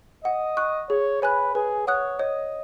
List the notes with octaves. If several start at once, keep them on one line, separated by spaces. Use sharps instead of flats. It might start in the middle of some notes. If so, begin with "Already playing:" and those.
D#5 F#5
C#6 F#6
G#4 C#5
B4 C#5 G#5 B5 F#6
G#4 B4
C#5 F#5 D#6 F#6
C#5 D#5